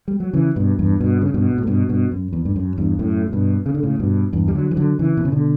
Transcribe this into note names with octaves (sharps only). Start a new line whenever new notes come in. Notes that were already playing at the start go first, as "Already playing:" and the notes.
G3
F#3
C#3 E3
G2 B2
E2 G2
G2 B2
C#3
G2 B2
G2
A2
G2 B2
G2 B2
F#2
E2
G2
F#2
E2 G2
F#2 A2
A2
G2 B2
C#3
D3
A2 C#3
G2 B2
E2 G2
G3
D3 F#3
E3
D3 F#3
C#3 E3
B2
C#3
B2 D3